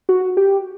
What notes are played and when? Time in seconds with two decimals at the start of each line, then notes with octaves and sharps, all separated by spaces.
0.09 F#4
0.37 G4